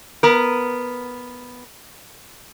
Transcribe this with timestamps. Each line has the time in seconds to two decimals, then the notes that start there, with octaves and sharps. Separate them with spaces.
0.23 B3 A#4